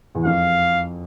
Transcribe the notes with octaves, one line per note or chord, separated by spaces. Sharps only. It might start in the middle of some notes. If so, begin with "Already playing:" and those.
E2
F2 F5